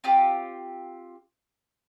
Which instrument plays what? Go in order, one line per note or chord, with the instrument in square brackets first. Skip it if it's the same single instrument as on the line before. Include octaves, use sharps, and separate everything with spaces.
[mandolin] C4 F4 G4